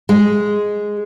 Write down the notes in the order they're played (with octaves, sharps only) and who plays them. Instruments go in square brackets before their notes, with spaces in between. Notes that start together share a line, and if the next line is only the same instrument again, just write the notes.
[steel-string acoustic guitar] G#3